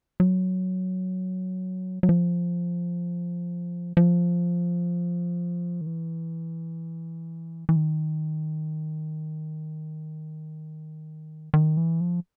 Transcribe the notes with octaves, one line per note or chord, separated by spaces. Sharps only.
F#3
F#3
F3
F3
D#3
E3
E3
D#3
D#3
E3
F3